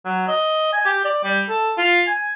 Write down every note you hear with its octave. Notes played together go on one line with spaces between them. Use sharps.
F#3
D#5
G#5
G4
D5
G3
A4
F4
G#5